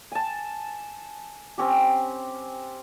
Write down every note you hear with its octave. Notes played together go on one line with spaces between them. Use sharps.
G#5 A5
C4 C#4 G4